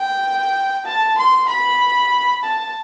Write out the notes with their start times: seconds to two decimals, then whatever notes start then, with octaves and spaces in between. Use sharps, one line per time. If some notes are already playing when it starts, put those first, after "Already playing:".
Already playing: G5
0.86 A5
1.18 C6
1.49 B5
2.44 A5